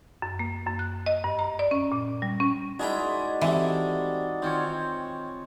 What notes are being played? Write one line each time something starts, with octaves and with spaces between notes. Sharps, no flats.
F#2
A#3
F#2
F#6
D#5
G2
A#5
D5
C#4
A#2
G3
C#4
G#3 D#4 E4 F#4 G#4 A#4 D5 G5
E3 G3 A3 C4
D#3 C4 F4 C#5